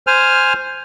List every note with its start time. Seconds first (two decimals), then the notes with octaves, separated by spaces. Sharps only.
0.07 C5 G#5 F6